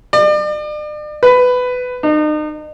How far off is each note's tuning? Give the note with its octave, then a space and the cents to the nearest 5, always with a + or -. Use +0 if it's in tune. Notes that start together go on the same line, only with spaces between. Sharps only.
D5 +40
B4 +15
D#4 -35